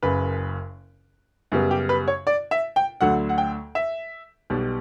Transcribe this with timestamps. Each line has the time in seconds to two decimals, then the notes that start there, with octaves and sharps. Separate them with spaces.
0.03 F#1 F#2 C#3 B4
1.52 F#2 C#3 G3 B3
1.71 G4
1.89 B4
2.08 C#5
2.27 D5
2.51 E5
2.76 G5
3.01 D2 D3 F#3 A3 F#5
3.29 F#5
3.38 G5
3.75 E5
4.50 B1 B2 G3